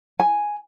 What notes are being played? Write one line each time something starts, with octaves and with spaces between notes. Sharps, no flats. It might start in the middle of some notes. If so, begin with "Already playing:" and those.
G#5